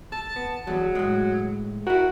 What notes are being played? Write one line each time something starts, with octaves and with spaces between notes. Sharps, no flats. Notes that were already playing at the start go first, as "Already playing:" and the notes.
A4 A5
B3
E2 F#3 G3
A2 G#3
E4 F#4 A#4